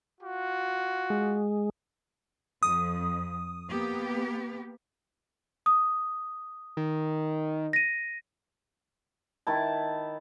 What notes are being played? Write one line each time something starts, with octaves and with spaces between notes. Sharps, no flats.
F4 F#4
G#3
F2 D#6
A#3 B3 G4
D#6
D#3
A#6 D#7
D#3 E4 A5